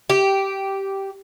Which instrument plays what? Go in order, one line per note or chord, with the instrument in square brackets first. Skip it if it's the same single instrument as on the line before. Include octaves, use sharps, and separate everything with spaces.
[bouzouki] G4